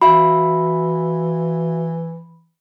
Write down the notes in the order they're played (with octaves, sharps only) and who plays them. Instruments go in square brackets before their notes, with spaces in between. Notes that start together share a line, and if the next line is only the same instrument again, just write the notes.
[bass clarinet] E3 [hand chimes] F#4 E5 F5 [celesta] B5